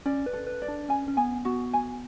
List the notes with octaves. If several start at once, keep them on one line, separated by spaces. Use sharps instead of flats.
C#4 D5
B4
A4
B4
D5
D4
C#4 G#5
C#4
B3 G#5
B3 F#4
G#5